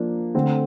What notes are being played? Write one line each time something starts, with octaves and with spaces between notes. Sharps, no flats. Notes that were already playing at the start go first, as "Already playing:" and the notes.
Already playing: F3 A#3 D4
D3 A3 C4